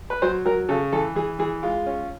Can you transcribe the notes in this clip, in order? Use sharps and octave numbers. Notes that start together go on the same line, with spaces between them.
B4
F#3 C5
F#3 A#4
C#3 A4
E3 A4
E3 G#4
E3 G#4
G#3 F4
C#4